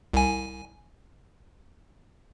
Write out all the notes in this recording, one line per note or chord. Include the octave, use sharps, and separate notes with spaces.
C2 G#5